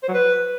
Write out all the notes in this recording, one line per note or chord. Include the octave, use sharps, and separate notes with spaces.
C5
F#3
B4